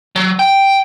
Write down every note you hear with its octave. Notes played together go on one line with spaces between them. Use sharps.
F#3
G5